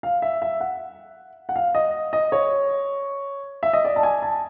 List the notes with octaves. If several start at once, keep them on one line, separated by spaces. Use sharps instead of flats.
F5
E5
E5
F#5
F#5
F5
D#5
D#5
C#5
E5
D#5
D5
A5
G#5
A5